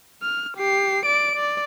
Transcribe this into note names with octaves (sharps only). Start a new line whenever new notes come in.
F6
G4 C7
D5 D7
D5